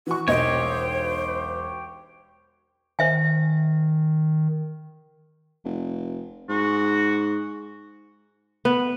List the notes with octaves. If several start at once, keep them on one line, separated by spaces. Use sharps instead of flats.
E3 F#4 C#6
E1 B1 G4 C5 C#5 D#5
D#3 C5 E5 G#5
F1
G#2 F#4
B3